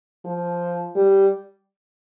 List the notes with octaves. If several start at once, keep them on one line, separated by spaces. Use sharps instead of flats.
F3
G3